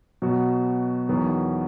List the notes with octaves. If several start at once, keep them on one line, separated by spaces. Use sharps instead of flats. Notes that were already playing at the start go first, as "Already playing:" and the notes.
B2 F#3 B3 F#4
E2 D#3 F#3 B3